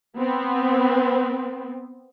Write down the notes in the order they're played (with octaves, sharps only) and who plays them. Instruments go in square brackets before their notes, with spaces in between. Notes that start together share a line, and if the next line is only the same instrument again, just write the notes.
[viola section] B3 C4